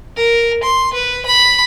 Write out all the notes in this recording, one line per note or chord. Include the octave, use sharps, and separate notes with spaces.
A#4
C6
B4
B5